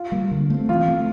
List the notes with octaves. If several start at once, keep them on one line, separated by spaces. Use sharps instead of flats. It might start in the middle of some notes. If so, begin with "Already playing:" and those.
Already playing: F4
G3 A#3
D3
A3 C4
E3 F4
A3 C4